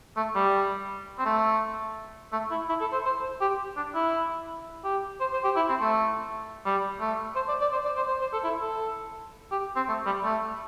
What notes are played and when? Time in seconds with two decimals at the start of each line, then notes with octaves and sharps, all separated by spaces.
0.17 A3
0.35 G3
1.19 C4
1.25 A3
2.32 A3
2.51 E4
2.69 E4
2.81 A4
2.92 C5
3.05 C5
3.41 G4
3.76 D4
3.95 E4
4.84 G4
5.20 C5
5.33 C5
5.44 G4
5.56 E4
5.69 C4
5.81 A3
6.65 G3
7.01 A3
7.36 C5
7.48 D5
7.61 D5
7.72 C5
7.85 D5
7.96 C5
8.08 C5
8.21 C5
8.33 A4
8.44 E4
8.62 A4
9.52 G4
9.76 C4
9.89 A3
10.06 G3
10.24 A3